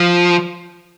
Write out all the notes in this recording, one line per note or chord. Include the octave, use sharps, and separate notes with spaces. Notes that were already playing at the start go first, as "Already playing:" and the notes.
Already playing: F3